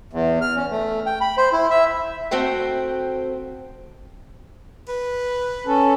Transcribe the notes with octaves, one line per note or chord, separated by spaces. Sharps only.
E2
F6
C#4
A3
G5
B5
C5
E4
E5
A3 C4 F#4 C5 G5
B4
C#4 A4